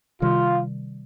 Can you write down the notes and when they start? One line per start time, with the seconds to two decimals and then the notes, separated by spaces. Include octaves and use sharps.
0.22 C3 D#3 G3 F4